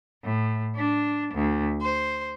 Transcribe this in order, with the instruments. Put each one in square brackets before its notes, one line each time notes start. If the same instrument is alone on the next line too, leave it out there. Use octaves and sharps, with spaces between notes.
[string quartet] A2
D4
D2
C5